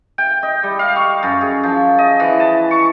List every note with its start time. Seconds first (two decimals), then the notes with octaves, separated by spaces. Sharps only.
0.18 G5
0.43 D#5
0.63 G3
0.79 F5
0.96 C#6
1.23 F#2
1.41 G#4
1.63 F3
1.99 D#5
2.20 E3
2.40 A5
2.71 C#6